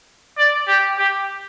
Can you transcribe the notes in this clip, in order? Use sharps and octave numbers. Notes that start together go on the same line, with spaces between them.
D5
G4
G4